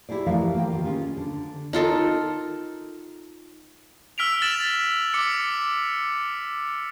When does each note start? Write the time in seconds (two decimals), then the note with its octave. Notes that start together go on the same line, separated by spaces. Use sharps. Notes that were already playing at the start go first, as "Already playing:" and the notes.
0.09 E4 G4 G#4 D5
0.26 E3 F3 A3 A#4 F5
0.54 A#3 G4 G5
0.70 D#3 F4
0.84 C#4 F4 G#4
1.17 D3
1.73 D#4 F4 A4 A#4
4.18 E6 F6 B6 D7 F7
4.42 A6 E7 F#7
5.14 D6 C#7